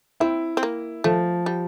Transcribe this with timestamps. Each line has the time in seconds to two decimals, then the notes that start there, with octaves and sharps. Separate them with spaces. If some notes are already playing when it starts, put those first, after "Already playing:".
0.20 C4 E4
0.57 C4
0.63 A#3
1.04 F3 A3
1.46 G3